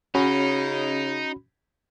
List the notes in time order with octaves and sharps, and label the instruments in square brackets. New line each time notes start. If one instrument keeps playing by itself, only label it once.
[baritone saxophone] C#3 [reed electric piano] C#4 F#4 B5 [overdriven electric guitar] D#4